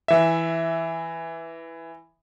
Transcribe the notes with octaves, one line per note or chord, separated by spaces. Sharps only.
E3 E5